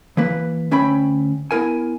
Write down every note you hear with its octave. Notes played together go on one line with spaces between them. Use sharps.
E3 A#3 B4
D2 C#4 E5 G5 B5
B3 E4 A#4 G#5